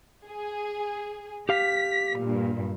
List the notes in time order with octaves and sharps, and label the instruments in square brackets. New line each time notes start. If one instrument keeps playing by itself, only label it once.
[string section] G#4
[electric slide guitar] G4 F5 [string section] B6
[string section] G2 A#2